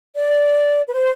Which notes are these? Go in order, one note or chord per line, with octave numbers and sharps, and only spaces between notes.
D5
B4
C5